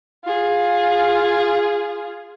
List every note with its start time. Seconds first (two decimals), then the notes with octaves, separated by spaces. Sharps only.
0.24 F4 G#4